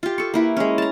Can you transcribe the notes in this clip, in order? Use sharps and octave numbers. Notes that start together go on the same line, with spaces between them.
F4 G4
A4 C#6
A#3 E4 B4
G#3 C#4
A5 A#5